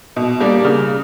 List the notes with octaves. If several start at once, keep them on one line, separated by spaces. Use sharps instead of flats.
B2
G3 A#3 D4
C#3